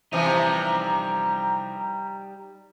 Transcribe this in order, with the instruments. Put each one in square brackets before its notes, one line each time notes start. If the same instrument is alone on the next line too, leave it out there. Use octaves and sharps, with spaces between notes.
[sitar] C3 E3 F3 [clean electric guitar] G3 D#4 D#5 [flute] A#5